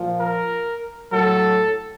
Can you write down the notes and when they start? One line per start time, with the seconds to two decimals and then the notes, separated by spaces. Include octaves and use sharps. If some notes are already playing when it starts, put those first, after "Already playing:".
Already playing: A#2 F3
0.18 A#4
1.12 A2 F#3 A4